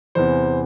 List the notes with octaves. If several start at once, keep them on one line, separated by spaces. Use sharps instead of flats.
E2 C3 E3 C5